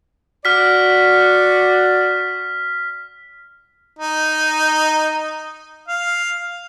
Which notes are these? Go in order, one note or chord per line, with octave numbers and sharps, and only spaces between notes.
F#4 D5 F6 B6
D#4
F5